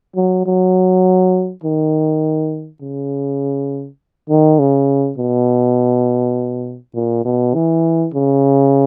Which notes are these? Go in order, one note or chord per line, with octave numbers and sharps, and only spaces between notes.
F#3
F#3
D#3
C#3
D#3
C#3
B2
A#2
B2
E3
C#3